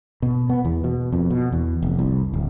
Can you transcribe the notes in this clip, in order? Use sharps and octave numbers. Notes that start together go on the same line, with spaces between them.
B2
B3
E2
B2
F2
B2
E2
F1
C2
D1